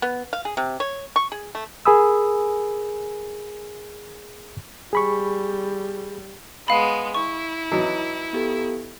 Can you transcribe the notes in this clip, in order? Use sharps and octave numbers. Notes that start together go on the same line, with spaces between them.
B3
F5
G#4
C3
C#5
C#6
G#4
A3
G#4 A#4 G#5 B5 D#6 E6
G3 G#4 B5 C#6
G#3 B3 F5 B5
E4 C#6
E3 F#3 D#4
B3 G4 A4